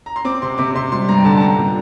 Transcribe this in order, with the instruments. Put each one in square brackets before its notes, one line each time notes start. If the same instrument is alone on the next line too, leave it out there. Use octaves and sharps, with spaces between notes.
[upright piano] A#5
C6
C4 D6
C3 C6
C3 D6
C3 C6
G3 C6
G2 A#5
G5
D3 A5
A5
G2 A#5
A#2